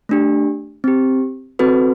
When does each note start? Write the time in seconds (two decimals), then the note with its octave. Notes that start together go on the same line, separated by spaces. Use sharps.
0.09 A3 D4 G4
0.84 C4 G4
1.59 C4 F#4 A4 B4